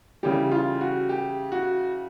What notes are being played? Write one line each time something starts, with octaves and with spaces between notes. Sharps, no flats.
C#3 E3 G3 G4
F4
F#4
G4
F#4